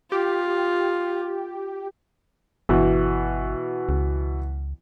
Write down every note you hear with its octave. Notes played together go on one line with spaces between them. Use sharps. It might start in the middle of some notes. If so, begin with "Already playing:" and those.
F4 G4
G1 B2 E3
C#2